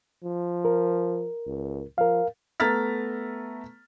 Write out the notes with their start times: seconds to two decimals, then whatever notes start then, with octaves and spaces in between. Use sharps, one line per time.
0.24 F3
0.65 A#4
1.46 C#2
1.98 F3 A#4 F5
2.60 A3 B3 A#5 F6 A6 B6